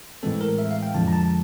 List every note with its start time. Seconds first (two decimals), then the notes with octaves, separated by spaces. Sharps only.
0.23 A2 E3 G#3 C4 A4
0.41 A#4
0.59 E5
0.71 F5
0.83 G5
0.95 F2 D3 F3 G#3 A5
1.08 A#5
1.13 A5